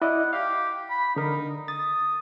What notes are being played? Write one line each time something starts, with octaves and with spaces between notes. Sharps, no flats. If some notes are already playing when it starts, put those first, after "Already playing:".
E4 D5 D#5 F#5
G4 F5
B5
D3 D#4 A#4
D#6 A6